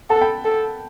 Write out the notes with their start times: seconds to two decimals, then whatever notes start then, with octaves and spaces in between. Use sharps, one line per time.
0.10 A4 F#5 A5
0.21 G5 B5
0.45 A4